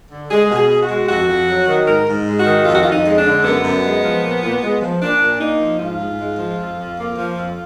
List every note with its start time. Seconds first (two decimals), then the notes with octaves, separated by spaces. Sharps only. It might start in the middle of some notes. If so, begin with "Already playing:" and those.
0.11 D3
0.31 G#3 G#4
0.50 B2
0.56 G#4
0.70 B2
0.83 F#4
0.89 G#3
1.09 F2 F#4
1.28 F2
1.48 F#3
1.68 D#3
1.87 G#2 A#4
2.07 G#2
2.27 G#3
2.40 F#4
2.46 D#3
2.65 F2 F4
2.74 F#4
2.82 F2 F4
2.92 D#4
3.05 G#3
3.18 D4
3.25 D3
3.44 F#2 B3
3.64 F#2
3.84 G#3
4.03 F3
4.23 A#2
4.42 A#2
4.62 G#3
4.81 F3
5.01 A#2 D4
5.21 A#2
5.40 A#3 D#4
5.60 F3
5.79 G#2 F4
5.99 G#2
6.19 G#3
6.39 F3
6.58 F2
6.77 F2
6.97 A#3
7.17 F3
7.36 F2